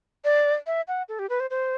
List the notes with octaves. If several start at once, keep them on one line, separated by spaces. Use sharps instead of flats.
D5
E5
F#5
A4
G4
B4
C5
C5